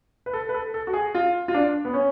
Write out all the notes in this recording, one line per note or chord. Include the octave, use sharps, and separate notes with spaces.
B4
A4
B4
A4
A4
F#4
G#4
F4
F4
D4
B3
C#4